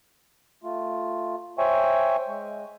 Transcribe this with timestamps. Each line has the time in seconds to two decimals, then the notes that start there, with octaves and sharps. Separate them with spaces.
0.64 A3 F4
1.58 C5 C#5 E5 G5 G#5 C#6
2.28 G#3